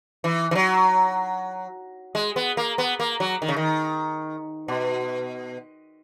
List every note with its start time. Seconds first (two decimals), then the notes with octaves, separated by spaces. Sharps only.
0.24 E3
0.51 E3
0.55 F#3
2.15 G#3
2.36 B3
2.57 A#3
2.78 B3
3.00 A#3
3.20 F#3
3.42 D#3
3.48 C#3
3.56 D#3
4.68 B2